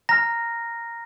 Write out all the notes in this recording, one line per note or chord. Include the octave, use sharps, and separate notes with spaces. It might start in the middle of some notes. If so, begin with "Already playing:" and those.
A#5 F6 A#6